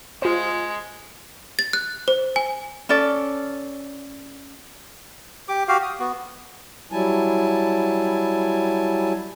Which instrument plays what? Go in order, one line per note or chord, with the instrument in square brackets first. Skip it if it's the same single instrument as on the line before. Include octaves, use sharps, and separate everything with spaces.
[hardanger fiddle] G#3 [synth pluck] F4 C5
[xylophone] A6
F#6
C5
G#5
[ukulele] C#4 A4 D5
[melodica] G4 D6
F#4 G4 F5
D#6
B3 F#4
[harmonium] F#3 G3 E4 G#5 A5